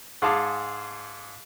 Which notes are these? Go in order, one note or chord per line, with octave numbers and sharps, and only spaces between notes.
G#2 G#4 F5 A5 D6